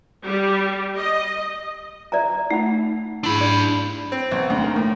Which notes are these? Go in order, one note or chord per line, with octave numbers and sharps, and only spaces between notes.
G3
D#5
D5 E5 A#5
A3 D#4 F#5 B5
G#2 D4 E4 B5 C6
D5
C4
B1
D2
A#4
A2